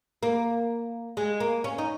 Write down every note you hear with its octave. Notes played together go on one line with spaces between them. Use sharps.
A#3
G#3
A#3
C#4
D#4